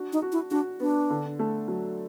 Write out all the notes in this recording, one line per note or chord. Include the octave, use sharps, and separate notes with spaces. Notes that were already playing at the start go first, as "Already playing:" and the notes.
Already playing: D4 F#4
D#4
F#4
E4
D4 F#4
B3 D4
D3
A3
F#3